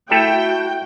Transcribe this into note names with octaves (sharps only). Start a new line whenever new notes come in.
A3 E4 F#4 A4 G5